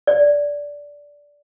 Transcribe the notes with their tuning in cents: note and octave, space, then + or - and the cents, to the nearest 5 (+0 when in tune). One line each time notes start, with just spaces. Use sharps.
D5 -10